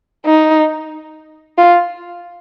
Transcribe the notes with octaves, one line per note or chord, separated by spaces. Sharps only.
D#4
F4